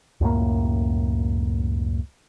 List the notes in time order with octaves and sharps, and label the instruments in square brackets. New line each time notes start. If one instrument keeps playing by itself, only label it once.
[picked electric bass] C#2 F#2 A2 A#3